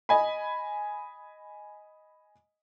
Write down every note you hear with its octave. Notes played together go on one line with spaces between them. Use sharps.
D#5 G#5 B5